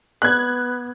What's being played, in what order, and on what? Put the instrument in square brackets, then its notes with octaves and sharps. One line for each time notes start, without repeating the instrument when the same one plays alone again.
[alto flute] B3 [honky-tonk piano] F#6 G#6